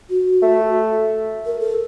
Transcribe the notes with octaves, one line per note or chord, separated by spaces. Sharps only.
F#4
A3
A#4
A4